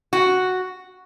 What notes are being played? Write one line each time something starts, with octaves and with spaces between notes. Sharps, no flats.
F#4